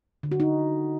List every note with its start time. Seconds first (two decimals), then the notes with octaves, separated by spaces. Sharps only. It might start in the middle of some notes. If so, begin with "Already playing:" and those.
0.23 D3
0.32 F#4
0.40 D#4